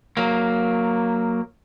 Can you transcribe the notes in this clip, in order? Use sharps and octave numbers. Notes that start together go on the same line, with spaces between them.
F#3 A#3